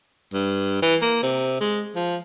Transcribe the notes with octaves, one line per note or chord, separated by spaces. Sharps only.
G2
E3
A#3
C3
G#3
F3